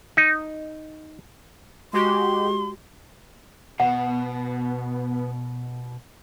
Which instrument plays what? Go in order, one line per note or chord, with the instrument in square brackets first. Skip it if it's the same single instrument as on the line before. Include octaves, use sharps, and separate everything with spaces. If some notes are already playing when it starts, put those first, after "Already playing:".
[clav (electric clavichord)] D#4
[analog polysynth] G#3 F#4 G4 [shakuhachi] C6
[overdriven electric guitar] B2 [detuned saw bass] B3 [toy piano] F#5